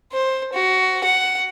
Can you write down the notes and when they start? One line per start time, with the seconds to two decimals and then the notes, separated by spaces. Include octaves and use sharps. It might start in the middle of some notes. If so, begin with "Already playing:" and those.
0.13 C5
0.53 F#4
1.04 F#5